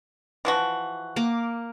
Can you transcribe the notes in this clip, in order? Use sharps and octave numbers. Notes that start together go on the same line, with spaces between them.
E3 F3 F#4
A#3 D6